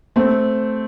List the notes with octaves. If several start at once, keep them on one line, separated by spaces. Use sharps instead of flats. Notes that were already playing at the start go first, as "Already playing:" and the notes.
A3 C4